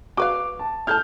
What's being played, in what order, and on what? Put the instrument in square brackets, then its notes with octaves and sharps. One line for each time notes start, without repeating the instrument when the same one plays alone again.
[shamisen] F#4 B4 F5 [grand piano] D6
[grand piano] A5
[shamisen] E4 A4 A5 [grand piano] F6 G6